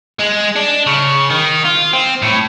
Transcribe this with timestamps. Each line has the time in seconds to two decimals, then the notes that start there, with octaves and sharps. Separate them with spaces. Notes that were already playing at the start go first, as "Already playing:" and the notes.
0.19 G#3
0.56 D4
0.87 C#3
1.30 D#3
1.64 F4
1.93 C4
2.22 A2